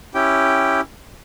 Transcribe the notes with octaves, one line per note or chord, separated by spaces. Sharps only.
C#4 E4 G4 G5